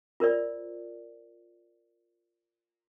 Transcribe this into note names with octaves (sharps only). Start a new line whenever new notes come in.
F4 A#4 C5 D5